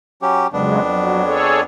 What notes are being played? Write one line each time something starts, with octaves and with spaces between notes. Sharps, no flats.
F#3 C#4 G4
F2 C#3 F#3 G#3 B3 D4
F#3
G#4 A4 C#5